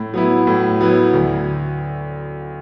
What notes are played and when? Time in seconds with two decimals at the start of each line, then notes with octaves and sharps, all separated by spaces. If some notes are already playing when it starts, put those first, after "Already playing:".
Already playing: A2
0.14 F#3 B3 E4
0.47 A2
0.81 F#3 B3 E4
1.14 D2